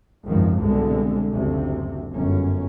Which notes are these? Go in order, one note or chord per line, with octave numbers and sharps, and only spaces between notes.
G#1 C#2 F#2 D#3 F3
C2 B2 D3 G#3
F#1 D2 C3
G1 F#2 C#4